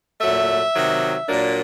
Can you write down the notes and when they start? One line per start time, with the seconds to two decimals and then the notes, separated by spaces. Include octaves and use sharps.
0.20 A#2 F#3 A3 E5
0.73 C3 D#3 F#3
1.26 A#2 F#3 A#3 D4